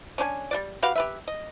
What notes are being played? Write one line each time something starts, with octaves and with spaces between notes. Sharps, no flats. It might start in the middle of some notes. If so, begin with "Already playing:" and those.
C#4 D4 C5 G#5
G3 F#4 D5
F#4 G4 B4 F5
G4 B4 E5
D#5